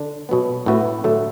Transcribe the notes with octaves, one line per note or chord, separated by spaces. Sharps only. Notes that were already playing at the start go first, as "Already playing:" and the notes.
Already playing: D3 D4
B2 F#3 B3
A2 A3 F#4 B4
D3 F#3 A3